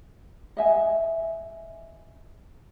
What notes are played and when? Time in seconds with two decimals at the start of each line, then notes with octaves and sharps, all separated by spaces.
0.57 D#5 E5 G#5